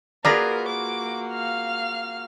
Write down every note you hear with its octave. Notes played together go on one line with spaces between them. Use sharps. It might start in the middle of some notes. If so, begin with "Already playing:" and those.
A#3 F4 F#4 G#4 A#4 B4 D5 A#5
D6
F5 F6